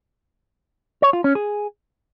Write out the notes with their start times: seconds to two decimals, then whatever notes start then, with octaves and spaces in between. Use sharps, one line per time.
1.02 C#5
1.13 F4
1.24 C#4
1.35 G#4